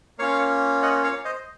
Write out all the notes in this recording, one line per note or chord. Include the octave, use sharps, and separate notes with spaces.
A#3 C#4 F4 C#5 F5
D#5 F#5
C#5 F5
C5 D#5